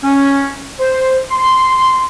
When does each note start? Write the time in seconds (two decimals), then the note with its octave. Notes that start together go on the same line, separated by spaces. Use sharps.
0.03 C#4
0.80 C5
1.31 C6